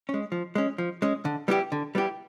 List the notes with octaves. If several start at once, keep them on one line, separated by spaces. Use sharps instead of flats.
G#3 C#4
F3
G#3 C#4
F3
G#3 C#4
D3
G3 B3 E4 G4
D3
G3 B3 E4 G4